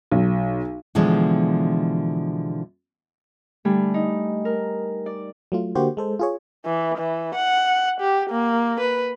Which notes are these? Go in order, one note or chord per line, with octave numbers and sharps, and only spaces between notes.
B1
B2 D3 E3 F3 G#3
D3 G3 A3 G#5 B5
D#4
A#4
D5
F#3 A3 F4
D3 A#3 F#4 G4 C5
G#3 A4 C5
F4 G#4 C#5
E3
E3
F#5
G4
A#3
B4